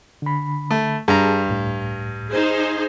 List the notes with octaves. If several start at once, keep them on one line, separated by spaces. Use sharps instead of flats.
D3 B5
A3
G2 G#4 A5 A#5
C#2 A2
D#4 G#4 C5